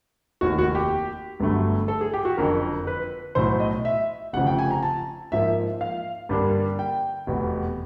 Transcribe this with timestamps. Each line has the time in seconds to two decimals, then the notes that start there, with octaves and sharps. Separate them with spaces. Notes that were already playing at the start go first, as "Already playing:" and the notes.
0.41 F1 D#2 D#3 F#4
0.59 F#4
0.75 G4
1.40 G1 G2 D3 F#3 A3
1.88 A4
2.01 G#4
2.14 G4
2.25 F#4
2.37 F#1 F2 D3 A#4
2.87 B4
3.35 B1 A2 F#3 C5
3.60 D#5
3.85 E5
4.33 F1 F2 C#3 F3 F#5
4.47 G5
4.59 G#5
4.71 A#5
4.83 A5
5.32 G#2 F3 A#3 E5
5.81 F5
6.29 G2 D3 G3 A#3 D4
6.79 G5
7.27 F1 E2 B2